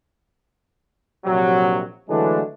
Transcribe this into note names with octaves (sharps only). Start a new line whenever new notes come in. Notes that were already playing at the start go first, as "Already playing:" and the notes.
A#1 C3 F#3
D3 E3 F#3 G#3 A3 D4